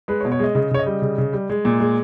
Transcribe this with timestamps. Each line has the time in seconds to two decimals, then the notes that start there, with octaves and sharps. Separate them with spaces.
0.08 G#3 B4
0.20 C#5
0.25 B2
0.32 C#5
0.39 G#3 D#5
0.55 C#3 D#5
0.71 C#3 C#5
0.79 D#5
0.86 G3
1.02 C#3
1.18 C#3
1.33 G3
1.50 G#3
1.65 A#2
1.80 G#3